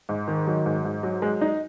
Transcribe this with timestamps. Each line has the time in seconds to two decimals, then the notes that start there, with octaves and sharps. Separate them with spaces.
0.09 G#2
0.28 D#3
0.47 F#3
0.66 G#2
0.85 G#2
1.03 F#3
1.22 G#3
1.41 D#4